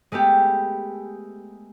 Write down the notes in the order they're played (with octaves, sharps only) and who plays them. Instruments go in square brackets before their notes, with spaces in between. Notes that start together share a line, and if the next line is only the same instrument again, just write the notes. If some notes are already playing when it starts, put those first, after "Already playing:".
[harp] G#3 A3 B3 G4